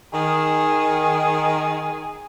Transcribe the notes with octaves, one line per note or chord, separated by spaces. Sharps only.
D#3 G#4